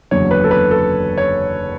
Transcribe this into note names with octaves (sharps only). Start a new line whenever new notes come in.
F#1 E2 D3 F#3 C#5
B4
A4
B4
A4
C#5